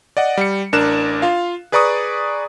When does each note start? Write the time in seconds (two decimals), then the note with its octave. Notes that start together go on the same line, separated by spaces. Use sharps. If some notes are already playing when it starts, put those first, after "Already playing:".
0.17 D5 D#5 F#5
0.37 G3 C#7
0.73 A1 D4 A#4 F#6 E7
1.22 F4 F5
1.72 G#4 B4 D5 A#5 C#6 D#6